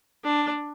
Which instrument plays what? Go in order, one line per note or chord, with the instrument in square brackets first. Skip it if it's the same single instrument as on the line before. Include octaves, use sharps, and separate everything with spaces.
[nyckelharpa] D4